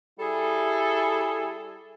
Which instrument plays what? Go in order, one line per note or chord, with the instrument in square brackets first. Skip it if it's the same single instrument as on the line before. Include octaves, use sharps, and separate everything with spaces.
[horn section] G3 E4 G#4 A4